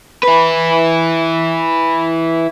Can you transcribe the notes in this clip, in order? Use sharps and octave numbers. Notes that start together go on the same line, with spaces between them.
E4 B4